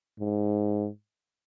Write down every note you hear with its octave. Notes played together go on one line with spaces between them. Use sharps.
G#2